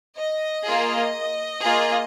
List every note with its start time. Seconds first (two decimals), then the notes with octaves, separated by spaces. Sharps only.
0.18 D#5
0.65 A#3 F4 G#4
1.60 A#3 F4 G#4